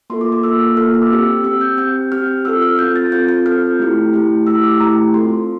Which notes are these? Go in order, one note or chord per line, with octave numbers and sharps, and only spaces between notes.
A#3 F4 A4 C6
D6
D6
A#3 F4 A4 E6
A#3 F4 A4 F6
E6
D6
C4 G4 E6
C4 G4 E6
G6
C4 G4 G6
C4 G4 F6
C4 F4 A4 E6
F6
C4 F4 A4 G6
A6
C4 F4 A4 G6
G6
C4 F4 A4 F6
A3 E4 G4
A3 E4 G4
A3 E4 G4 E6
D6
A3 E4 G4 A#5
C4 F4 A4 C6